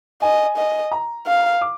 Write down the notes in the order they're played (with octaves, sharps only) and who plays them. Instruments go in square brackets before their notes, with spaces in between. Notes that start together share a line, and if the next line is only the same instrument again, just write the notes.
[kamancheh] D#5 [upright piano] G#5
[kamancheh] D#5
[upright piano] A#5
[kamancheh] F5
[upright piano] D6